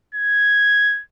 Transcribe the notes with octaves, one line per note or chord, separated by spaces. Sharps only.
G#6